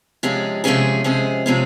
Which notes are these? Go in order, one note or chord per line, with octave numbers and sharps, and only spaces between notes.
C3 F3 G#3 C#4 G#4
C3 F3 G#3 C#4 G#4
C3 F3 G#3 C#4 G#4
C3 F3 G#3 C#4 G#4